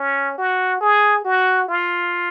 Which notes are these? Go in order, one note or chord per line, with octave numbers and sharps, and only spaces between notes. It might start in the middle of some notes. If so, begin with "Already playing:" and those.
Already playing: C#4
F#4
G#4
F#4
F4